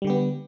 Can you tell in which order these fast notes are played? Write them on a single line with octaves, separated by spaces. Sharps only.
G3 D3 G4 B3